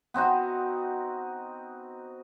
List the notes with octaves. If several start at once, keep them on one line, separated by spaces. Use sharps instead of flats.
B3 C4 D#4 F#4